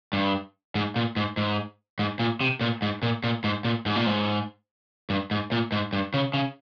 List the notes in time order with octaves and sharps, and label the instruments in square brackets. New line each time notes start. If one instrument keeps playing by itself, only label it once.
[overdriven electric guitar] G2
G#2
A#2
G#2
G#2
G#2
A#2
C3
A#2
G#2
A#2
A#2
G#2
A#2
G#2
A#2
G#2
G2
G#2
A#2
G#2
G2
C#3
C#3